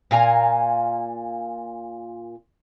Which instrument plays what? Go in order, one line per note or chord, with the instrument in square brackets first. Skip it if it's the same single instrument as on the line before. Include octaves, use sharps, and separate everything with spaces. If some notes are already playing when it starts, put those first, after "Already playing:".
[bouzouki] A#2 F5 G#5 A#5